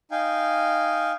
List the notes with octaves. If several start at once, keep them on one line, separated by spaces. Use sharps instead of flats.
D#4 F5 G5 G#5